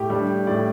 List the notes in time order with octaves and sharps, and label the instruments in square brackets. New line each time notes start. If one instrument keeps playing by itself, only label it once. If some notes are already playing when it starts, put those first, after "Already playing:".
Already playing: [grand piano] A2 G4
G3 D4
A2 D5